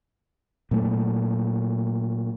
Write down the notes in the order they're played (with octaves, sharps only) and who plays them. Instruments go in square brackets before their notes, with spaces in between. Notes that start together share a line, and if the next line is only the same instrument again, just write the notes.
[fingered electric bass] A#2 F#3 A3